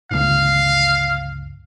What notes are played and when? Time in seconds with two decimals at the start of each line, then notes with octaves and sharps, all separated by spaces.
0.11 G1 C#2 F5